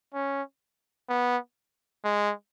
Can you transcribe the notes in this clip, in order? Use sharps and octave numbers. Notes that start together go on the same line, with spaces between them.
C#4
B3
G#3